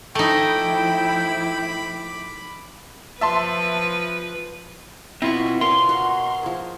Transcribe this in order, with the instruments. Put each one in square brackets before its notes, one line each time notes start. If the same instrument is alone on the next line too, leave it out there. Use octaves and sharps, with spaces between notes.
[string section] F3 E4 [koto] A3 D#4 [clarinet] G5 [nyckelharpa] B5 D6
[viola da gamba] F3 B4 [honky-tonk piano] E5 A5 C6
[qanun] B2 C#6 [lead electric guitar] C4 F4 [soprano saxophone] E4
[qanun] F4 C#5 D5 [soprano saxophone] A#4 [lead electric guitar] C6
[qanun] F#4 D#5
F3 G#4